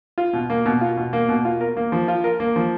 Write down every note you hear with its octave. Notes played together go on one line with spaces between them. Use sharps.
F4
B2
A#3
B2
F4
B2
A#3
B2
F4
A#4
A#3
F3
F4
A#4
A#3
F3